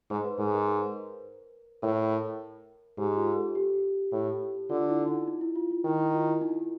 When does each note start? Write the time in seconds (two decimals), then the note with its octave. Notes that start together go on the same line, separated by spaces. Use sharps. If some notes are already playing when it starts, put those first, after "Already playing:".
0.10 G#2 C5
0.25 B4
0.39 G#2 A#4
0.54 A#4
0.67 A#4
1.82 A2 A#4
2.98 G#2 G4
3.17 F4
3.36 A4
3.55 G4
4.12 A2
4.70 D3 F4
4.89 E4
5.07 D#4
5.27 D#4
5.41 E4
5.56 F4
5.71 F4
5.85 D#3 E4
6.00 E4
6.14 F4
6.28 E4
6.41 D#4